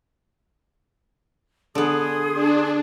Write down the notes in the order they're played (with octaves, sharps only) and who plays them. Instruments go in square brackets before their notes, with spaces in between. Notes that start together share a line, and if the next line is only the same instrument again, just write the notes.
[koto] D3 B3 [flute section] G#4 C6 D#6
[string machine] D4